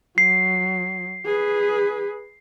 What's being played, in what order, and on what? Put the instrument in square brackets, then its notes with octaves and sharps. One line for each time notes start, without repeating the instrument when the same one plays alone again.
[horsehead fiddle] F#3 [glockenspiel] C7
[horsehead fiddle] G#4 B4